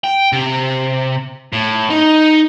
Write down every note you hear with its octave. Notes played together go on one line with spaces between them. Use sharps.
G5
C3
A2
D#4